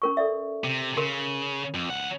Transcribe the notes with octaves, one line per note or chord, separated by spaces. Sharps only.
C#4 A#4 C#6
A4 D5 E5
C3
C#3 A#4 C6
F2
C#2 F#5